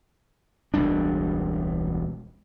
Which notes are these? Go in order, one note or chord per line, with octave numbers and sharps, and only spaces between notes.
E1 C#2 G3 D4